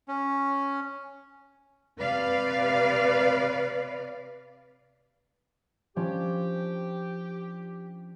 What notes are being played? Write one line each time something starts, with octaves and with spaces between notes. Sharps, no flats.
C#4
C3 B4 D5 F5
F3 C#4 D4 G4